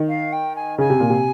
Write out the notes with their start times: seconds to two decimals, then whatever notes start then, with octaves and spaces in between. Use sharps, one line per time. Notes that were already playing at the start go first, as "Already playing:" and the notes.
Already playing: D#3
0.08 F5
0.32 G5
0.55 G#5
0.78 C#3 G#5
0.90 C3
1.00 A#2
1.10 C3